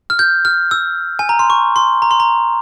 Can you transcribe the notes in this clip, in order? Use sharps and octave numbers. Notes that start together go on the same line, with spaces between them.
F6
G6
F6
E6
G#5
A#5
C6
C#6
C6
A#5
C6
A#5